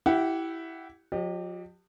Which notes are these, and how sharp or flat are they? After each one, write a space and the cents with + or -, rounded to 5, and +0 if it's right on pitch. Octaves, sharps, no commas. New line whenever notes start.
E4 +0 G4 -25 F#5 -5
F3 +45 G4 +0 D#5 -35